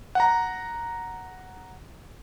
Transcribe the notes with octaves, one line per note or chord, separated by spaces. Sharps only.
F#5 A#5